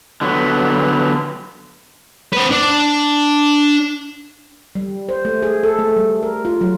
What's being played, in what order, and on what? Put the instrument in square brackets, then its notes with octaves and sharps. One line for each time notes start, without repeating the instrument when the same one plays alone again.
[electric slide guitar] D3 F#3 B3
[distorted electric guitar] C4 B4
D4
[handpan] G3
C5
A3
G#4
A4
A3
G3
A#4
F4
F#3